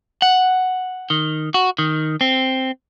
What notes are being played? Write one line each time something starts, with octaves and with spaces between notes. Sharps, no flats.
F#5
D#3
F#4
D#3
C4